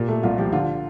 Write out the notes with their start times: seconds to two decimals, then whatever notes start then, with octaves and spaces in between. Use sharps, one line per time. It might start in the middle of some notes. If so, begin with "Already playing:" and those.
Already playing: A#2 G4
0.08 A3
0.23 C2 F4
0.38 F3 G4
0.53 D3 F4